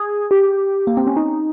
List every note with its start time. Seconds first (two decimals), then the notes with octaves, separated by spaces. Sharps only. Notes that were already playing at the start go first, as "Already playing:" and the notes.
Already playing: G#4
0.31 G4
0.87 A#3
0.97 C4
1.07 C#4
1.16 D#4